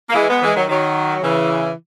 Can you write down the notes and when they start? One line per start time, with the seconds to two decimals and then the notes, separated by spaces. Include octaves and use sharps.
0.10 A#3
0.15 E3 G#3
0.28 G#3 B3
0.42 E3 G#3
0.56 D#3 F#3
0.69 D#3 F#3
1.22 C#3 E3